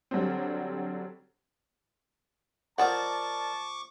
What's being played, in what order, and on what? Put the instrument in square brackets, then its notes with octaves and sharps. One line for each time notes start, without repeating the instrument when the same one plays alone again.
[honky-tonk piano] D3 F#3 G3 C4
[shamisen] F3 F#5 [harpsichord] A#4 D5 D#5 [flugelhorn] A5 [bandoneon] C#6 D6